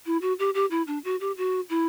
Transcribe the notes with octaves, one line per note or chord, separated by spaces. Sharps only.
E4
F#4
G4
G4
E4
D4
F#4
G4
F#4
E4